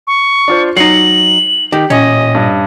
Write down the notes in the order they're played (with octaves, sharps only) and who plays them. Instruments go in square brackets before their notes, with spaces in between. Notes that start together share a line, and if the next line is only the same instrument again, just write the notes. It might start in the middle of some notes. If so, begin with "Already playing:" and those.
[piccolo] C#6
[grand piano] D4 F4 C5
[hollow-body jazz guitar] F#3 D#4 [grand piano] C7 C#7 [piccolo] F#7
[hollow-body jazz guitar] D#3 [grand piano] G4
[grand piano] A1 [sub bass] A#2 [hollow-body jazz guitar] C#4 [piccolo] D#5
[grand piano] G2